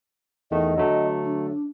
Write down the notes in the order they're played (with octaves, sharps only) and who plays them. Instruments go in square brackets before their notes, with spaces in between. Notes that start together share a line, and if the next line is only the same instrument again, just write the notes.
[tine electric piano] E2 D#3 A3 [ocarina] D#5
[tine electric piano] D3 F#3 A3
[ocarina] D4